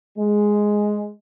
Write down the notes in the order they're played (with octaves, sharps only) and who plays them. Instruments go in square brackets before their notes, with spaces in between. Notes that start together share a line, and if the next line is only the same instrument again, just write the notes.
[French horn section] G#3